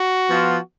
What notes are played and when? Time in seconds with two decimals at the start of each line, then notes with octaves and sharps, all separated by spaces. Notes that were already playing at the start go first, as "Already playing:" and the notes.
Already playing: F#4
0.28 F3 B3 F4